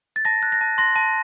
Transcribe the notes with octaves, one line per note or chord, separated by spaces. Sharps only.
A6
A5 A#6
F#6
A#6
A5
C6 A#6
A5